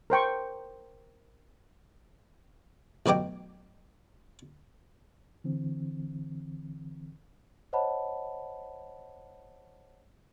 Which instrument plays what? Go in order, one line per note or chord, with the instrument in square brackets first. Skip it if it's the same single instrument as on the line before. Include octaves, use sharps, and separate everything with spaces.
[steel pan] A#4 C5 G5 C#6
[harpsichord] A1 B2 F#3 G4 D6
[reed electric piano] D3 E3 C4
[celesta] C5 C#5 D#5 F#5 A5 B5